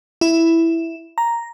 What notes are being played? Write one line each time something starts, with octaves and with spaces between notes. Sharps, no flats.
E4
A#5